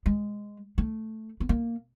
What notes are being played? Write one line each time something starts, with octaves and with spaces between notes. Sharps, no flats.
G#3
A3
B3
A#3